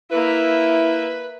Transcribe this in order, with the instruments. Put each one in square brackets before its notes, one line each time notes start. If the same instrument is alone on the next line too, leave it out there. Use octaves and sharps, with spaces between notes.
[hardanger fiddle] A#3 E5 [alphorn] E4 [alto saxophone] B4